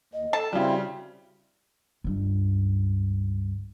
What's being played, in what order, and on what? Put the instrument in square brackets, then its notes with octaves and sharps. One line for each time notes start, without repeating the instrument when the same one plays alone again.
[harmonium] D#2 [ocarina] D#5
[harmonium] A4 [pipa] A5
[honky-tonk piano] C#3 G3 [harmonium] C4 E4 [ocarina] F#4
[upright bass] C#2 G2